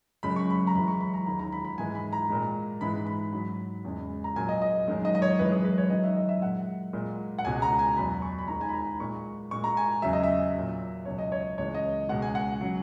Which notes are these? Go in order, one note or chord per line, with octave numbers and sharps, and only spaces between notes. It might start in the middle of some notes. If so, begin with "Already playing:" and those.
F#2 C#3 G#3 B5
C#6
B5
A#5
F#2 E3 G#3 B5
C#6
B5
A#5
D#2 D#3 G#3 A#5
A#5
B5
B5
G#2 E3 G#3 G#5
B5
A#5
A#2 G#3
G#2 E3 G#3 B5
B5
G#2 F#3
E2 C#3 G#3
A#5
A#2 F#3 G#5
D#5
D#5
F#2 D#3 G#3
D#5
D#5
C#5
F#2 E3 G#3 B4
G#4
B4
C#5
F#2 D#3 F#3 D#5
E5
D#5
E5
A#2 G#3 F#5
A#2 G#3
F#5
C#2 B2 G#3 G#5
A#5
G#5
E2 B2 F#3 B5
C#6
B5
D#2 D#3 G#3 A#5
G#5
B5
A#5
A#2 G#3 C#6
A#2 G#3 C#6
A#5
G#5
E2 C#3 F#3 E5
D#5
E5
A#2 F#3
C#2 B2 F#3 C#5
D#5
C#5
C#2 C#3 E3 G#3 C#5
D#5
C#2 B2 G#3 F#5
G#5
F#5
C#3 F#3